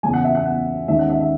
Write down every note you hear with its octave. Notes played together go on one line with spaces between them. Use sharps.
F#1 E2 C#3 G#5
F#5
E5
F#5
F#5
D#2 D#3 G#3 C#4 E5
F#5
E5
E5